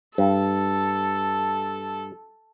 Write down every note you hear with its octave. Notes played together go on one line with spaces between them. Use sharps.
G2 A4